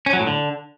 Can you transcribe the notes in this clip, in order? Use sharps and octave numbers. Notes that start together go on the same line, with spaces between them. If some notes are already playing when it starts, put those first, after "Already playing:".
C#4
F#3
A2
D3